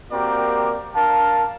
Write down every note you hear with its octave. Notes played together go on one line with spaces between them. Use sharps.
A#3 C4 F#4 G4 A#4 D5
D4 A#4 F5 A5